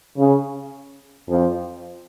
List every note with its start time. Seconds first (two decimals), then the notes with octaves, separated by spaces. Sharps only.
0.17 C#3
1.28 F2 F3